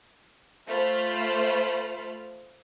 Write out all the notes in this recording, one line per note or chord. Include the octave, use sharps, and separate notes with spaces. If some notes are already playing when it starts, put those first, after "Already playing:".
A3 F4 C5 B5 F6